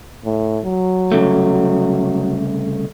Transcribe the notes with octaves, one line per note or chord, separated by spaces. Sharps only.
A2
F#3
C2 C#3 A3